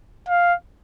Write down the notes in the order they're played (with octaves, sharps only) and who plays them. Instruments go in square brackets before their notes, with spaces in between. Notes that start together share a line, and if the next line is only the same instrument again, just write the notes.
[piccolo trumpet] F5